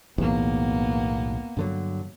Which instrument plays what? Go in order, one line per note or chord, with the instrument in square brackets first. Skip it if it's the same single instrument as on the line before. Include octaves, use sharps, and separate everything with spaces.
[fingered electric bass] B1 E2 A2 [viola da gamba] A#3 B3
[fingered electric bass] G2 D3 F#3